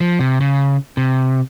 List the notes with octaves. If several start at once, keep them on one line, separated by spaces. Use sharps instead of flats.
F3
C3
C#3
C3